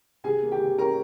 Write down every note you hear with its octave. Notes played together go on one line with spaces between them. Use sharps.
C3 G#4 G#5
A#3
G4 G5
C3
C#4 A#4 A#5